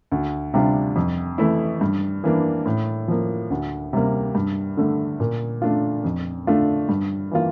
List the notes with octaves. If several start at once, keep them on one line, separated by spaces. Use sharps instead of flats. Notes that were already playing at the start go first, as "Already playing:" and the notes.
D2
C3 G3 D4 F4
F2
E3 A3 E4
G2
E3 A#3 D4
A2
F3 A#3
D2
C3 G3 A#3
G2
D3 A3
A#2
A3 D4 F4
F2
D3 A3 D4 F4
G2
E3 A#3 F4